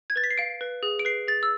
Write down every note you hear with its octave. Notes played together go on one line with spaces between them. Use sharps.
G#6
B4 A6
B6
C7
F5 D7
B4
G#4
D7
B4 C7
G#4 A6
E6